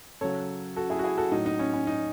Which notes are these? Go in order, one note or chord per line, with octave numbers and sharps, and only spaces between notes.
C#3 F#3 A4 C#5
F#4 A4
E4 G#4
F#4
E4 G#4
F#4 A4
A2 F#3 D#4
D#4
C#4
C#4
D#4